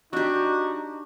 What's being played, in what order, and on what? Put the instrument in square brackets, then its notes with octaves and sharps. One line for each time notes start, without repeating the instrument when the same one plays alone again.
[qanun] D4 G4 [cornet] D#4 [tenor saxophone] F#4